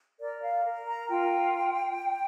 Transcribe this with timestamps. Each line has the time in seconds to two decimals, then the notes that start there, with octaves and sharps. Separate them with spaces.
0.21 A#4 D5
0.42 F5
0.65 A#4
0.88 A#5
1.09 F4 G5